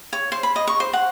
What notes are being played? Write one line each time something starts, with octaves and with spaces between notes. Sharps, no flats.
C#5
C5
B5
D#5
C#6
C5
F#5